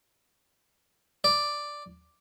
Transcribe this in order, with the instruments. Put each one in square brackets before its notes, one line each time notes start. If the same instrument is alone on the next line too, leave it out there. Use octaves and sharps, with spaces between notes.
[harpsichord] D5